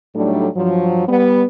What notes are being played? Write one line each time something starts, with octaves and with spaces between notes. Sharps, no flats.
A2 F#3 G3 A3 D4 D#4
G2 F3 F#3
G3 B3